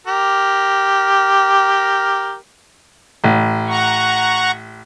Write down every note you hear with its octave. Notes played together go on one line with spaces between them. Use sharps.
G4 A#4
A1
F#5 A#5 C#6